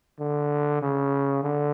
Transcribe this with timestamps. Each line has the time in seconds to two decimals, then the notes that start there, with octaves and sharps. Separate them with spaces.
0.19 D3
0.82 C#3
1.43 D3